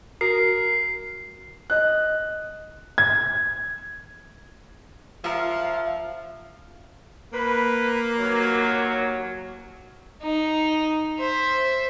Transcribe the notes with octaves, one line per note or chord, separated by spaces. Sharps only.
F#4 A#4 C7
D#5 F#6
G#6
F3 A#4 E5 F5
A#3 B4
D#2 F#3
D#4
C5 E5